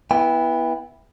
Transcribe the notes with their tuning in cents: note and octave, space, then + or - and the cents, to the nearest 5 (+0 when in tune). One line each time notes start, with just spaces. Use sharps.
B3 -15 E4 +0 G5 +35